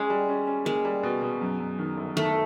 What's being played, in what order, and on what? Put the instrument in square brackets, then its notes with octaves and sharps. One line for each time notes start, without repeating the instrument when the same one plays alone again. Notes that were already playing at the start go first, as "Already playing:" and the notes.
Already playing: [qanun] G#3 [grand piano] C#4
[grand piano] G3
C#4
C#4
[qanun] G#3 [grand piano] A#3
[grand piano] G3
B2
B2
F#2
F#2
D#3
G1
[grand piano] D#3 [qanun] A3